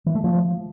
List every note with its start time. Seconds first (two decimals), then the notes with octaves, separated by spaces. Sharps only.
0.06 E3
0.15 A3
0.24 F3